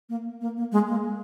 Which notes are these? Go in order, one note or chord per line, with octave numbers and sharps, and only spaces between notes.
A#3
A#3
A#3
G#3
A#3